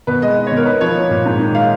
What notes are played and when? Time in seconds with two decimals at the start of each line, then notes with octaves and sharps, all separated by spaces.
0.07 B2 B4
0.22 G#3 D#5
0.37 D#4
0.47 B2 C#5
0.57 A#4
0.66 D#4 B4
0.81 F3 C#5
0.96 A#3
1.11 A#2
1.25 G#2
1.40 D#3
1.54 G#3 F5